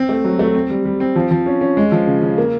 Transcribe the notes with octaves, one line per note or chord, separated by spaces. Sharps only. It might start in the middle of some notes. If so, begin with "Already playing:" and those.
Already playing: C4
A3
F#3
A3
C4
G3
G3
C4
F3
F3
C#4
C#4
G#3
F3
C#3
C#3
A#3